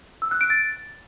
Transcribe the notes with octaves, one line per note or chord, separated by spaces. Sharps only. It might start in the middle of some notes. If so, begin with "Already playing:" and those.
E6
F#6
D7
A6